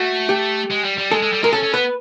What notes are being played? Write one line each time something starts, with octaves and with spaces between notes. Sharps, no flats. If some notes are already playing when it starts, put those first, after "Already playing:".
Already playing: A3 F#4
G4
G#3
G3
G3
G#3 A4
G#3
G3
G#3 A#4
C#4 A4
C#4
B3 B4